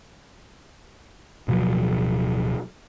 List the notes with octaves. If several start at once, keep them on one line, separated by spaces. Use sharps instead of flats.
D1 B2 F3 F#3